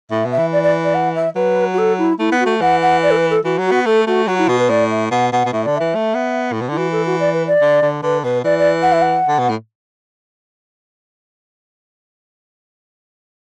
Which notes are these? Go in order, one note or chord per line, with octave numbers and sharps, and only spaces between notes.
A2 E5
B2
E5
E3
D5
D5
D5
F#5
E5
F#3 B4
F#4
A4
E4
A3 E4
B3
F#4
A3
E3 F#5
F#5
D5
A4
B4
A4
E3 F#4
F#3
F#4
B3
A3 A4
A3 F#4
F#3 F#4
E4
B2 F#4
B4
A2 D5
E5
B2 F#5
B2 F#5
B2
A2 E5
D3 D5
E3 E5
A3
B3
A2
B2
D3 E4
E3 F#4
A4
F#4
D5
B4
D5
D3
D3
D3 B4
B2 B4
E3 D5
D5
F#5
E5
F#5
D3
B2
A2